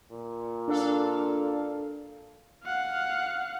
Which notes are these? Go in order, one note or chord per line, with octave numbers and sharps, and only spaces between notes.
A#2
D4 A4 F5
F5 F#5